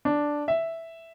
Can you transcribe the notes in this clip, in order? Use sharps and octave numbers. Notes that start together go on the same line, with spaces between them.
D4
E5